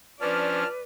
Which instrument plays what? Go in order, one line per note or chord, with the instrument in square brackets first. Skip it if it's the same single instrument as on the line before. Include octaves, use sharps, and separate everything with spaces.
[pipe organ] F3 C#4 D4 [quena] B4 [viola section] D5 [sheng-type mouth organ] A5 F6